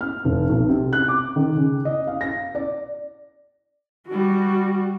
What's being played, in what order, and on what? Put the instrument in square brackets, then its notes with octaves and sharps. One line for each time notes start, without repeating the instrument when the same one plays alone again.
[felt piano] F6
F1
B1
C3
F#6
D6
D#3
C#3
D#5
F5
A#6
D5
[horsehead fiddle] G3 F#4